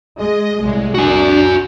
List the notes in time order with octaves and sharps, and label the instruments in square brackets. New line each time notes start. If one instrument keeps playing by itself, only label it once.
[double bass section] G#3 [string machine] D#5
[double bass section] C2 A2 [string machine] G#3
[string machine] D4 [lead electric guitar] F#4 G#5